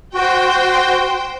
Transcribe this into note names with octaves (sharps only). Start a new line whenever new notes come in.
F#4 C5 G5